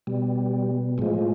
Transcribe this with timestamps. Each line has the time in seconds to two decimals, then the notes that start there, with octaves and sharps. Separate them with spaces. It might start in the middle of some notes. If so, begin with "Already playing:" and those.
0.07 B2 G3
0.98 A2 F3 G#3